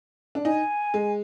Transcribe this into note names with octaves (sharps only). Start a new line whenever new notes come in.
D4
D#4 G#5
G#3